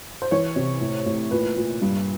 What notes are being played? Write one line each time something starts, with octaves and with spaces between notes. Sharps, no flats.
C5
E3 C#5
C3
A2
A2
A#2 B4
A#2
G2